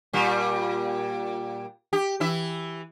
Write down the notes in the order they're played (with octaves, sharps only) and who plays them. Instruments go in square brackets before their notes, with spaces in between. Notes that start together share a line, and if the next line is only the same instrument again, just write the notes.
[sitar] A#2 G3
G4
E3 E4 E5